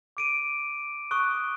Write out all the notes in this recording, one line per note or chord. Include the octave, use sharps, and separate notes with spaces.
D6 D7 D#7
C#6 D#6 F#6